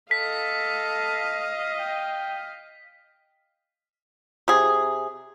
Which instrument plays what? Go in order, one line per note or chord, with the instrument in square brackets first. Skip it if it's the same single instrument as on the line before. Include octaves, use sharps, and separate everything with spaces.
[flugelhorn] A4 [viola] D#5 F5 [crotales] B6
[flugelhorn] G5
[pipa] C3 G#4